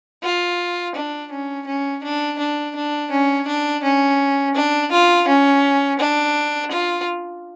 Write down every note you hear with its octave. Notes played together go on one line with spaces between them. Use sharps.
F4
D4
C#4
C#4
D4
D4
D4
C#4
D4
C#4
D4
F4
C#4
D4
F4